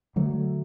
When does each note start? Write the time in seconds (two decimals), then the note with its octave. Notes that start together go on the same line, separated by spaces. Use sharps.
0.16 D3 F#3 A3